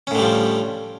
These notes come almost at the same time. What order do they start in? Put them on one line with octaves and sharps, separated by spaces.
C#4 A2 D3 G3 F3